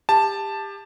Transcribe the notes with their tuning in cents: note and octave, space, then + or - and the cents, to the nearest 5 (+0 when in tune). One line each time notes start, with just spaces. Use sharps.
G4 +25 A5 +0